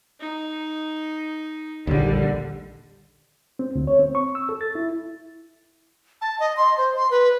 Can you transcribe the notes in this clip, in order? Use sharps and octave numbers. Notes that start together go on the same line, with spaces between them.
D#4
A#1 D#2 D3 G3
C4
D2
C#5
C4
C#6
E6
A4
A6
E4
A5
D#5
C6
C5
C6
B4